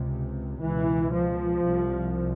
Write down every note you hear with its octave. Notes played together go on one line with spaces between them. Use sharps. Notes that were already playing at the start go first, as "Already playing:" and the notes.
Already playing: C#2 C3
C#2 B2 E3
F3
C2 C3